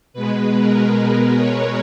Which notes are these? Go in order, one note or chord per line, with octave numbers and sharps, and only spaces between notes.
B2 G#3 B4
A#4
B4
C#5